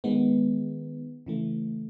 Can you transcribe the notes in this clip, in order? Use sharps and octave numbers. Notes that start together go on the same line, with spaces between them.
D#3 G#3 B3
C#3 E3 A3